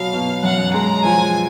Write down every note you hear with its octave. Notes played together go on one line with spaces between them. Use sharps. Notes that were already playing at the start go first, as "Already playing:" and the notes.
Already playing: B2 F#3 B3 F5
B2
F#2 F#5
G#3 A#5
F3 G#5